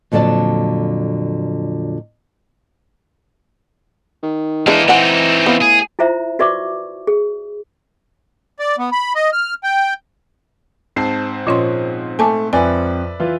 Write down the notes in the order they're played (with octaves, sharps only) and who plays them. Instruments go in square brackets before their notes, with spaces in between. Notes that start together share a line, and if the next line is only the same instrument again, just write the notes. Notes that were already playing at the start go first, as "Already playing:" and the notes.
[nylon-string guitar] F2 A#2 D3 F#3 D5 A5
[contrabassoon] D#3
[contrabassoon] E3 [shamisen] G#3 D4 [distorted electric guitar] A#3 D#4
[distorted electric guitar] C4 D#4 [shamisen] D5 F#5 G#5
[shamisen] B3 F5
[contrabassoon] A2 [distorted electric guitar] G#4
[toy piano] E4 F4 C5 E5 A#5
F#4 B4 D5 E5 C#6 D6
G#4
[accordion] D5
B3
B5
D#5
F6
G5
[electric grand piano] G#2 C4 C5 [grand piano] A5 C7
[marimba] A#2 C#4 C6 [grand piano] F3 [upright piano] C#5 D#5
[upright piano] A3 [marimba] G#5 A5 D6
[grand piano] F2 [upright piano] B4 D5 E5 [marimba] G#5
[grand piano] E3 E4 F4